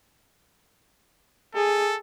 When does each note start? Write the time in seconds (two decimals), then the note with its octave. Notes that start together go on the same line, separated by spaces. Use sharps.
1.55 G#4 A4